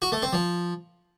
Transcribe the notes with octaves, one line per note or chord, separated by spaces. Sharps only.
F#4
A3
C4
F3